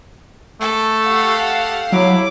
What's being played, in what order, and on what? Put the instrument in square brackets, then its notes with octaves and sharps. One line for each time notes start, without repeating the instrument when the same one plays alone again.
[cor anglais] A3 [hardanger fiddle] A4
[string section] G4 F5 F#5
[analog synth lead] F#3 [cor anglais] E4 [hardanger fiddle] D6